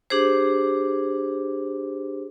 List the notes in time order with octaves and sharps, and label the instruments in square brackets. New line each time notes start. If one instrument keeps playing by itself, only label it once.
[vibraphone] D4 G4 G#4 C5